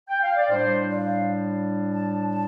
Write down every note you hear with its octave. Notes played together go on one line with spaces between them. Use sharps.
G5
F5
D5
A2 G3 D4 C5
D5
F5
A5
A5